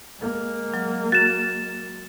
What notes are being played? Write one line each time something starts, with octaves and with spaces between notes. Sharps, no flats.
G#3 A#3
F#3
F#4 A6 E7